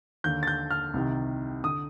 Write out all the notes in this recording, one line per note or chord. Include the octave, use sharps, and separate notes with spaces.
D#2 D3 G6
A6
G6
F6
C2 C3 D#3
D3 D#6